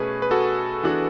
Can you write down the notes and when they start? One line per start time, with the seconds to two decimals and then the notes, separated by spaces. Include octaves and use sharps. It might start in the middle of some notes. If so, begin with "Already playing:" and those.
Already playing: B2 A3 C#4 G#4 B4
0.22 B4
0.31 F#4 A4
0.83 E3 B3 D4 F#4